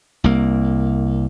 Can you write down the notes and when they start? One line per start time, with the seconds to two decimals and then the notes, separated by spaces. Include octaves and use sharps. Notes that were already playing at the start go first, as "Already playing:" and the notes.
0.24 C2 A#3